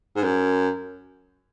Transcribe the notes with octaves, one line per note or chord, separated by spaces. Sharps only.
G#2
F#2